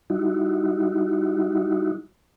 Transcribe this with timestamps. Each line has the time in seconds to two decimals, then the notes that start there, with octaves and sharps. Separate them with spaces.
0.10 G3 D#4 E4 F#4